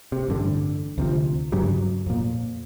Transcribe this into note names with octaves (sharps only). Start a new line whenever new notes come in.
C3
A1 G2 D3
D2 C3 F3
G2 C#3 F#3 G3
F2 A#2